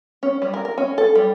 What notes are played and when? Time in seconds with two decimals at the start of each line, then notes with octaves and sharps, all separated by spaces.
0.23 C#4
0.42 G3
0.54 A#4
0.65 A#4
0.78 C#4
0.98 A4
1.15 G3